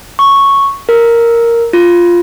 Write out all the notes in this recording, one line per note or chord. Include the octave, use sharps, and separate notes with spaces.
C#6
A#4
F4